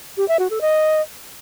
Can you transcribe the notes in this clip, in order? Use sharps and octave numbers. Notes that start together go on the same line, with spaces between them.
G4
E5
F#4
A4
D#5